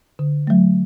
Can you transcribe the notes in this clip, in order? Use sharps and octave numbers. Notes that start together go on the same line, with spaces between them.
D3
F#3 A3